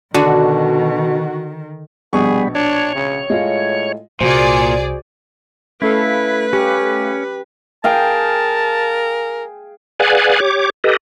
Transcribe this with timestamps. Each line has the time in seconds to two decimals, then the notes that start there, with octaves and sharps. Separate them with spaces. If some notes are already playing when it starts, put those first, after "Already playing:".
0.14 B2 D3 D#3 F#4
2.13 A#1 B2 G3 B3 G#4 C#6
2.55 D4 C#5
2.95 C#3
3.30 A2 G#3 F4 F5
4.21 C2 A#2 F#4 G#4 C5 D5
5.82 A3 C#4 E4 A4 B4 F5
6.53 C#4 G4
7.84 G#4 A#4 F5 G5 A5
10.00 G#4 B4 D5 F5 F#5 G#5
10.40 G4 C#5 D6
10.84 G4 A4 B4 D#5